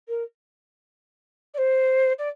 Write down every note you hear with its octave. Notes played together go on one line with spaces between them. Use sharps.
A#4
D5
C5
D5